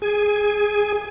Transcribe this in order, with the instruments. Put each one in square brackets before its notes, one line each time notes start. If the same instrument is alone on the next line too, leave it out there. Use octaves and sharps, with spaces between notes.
[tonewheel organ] G#4 G#5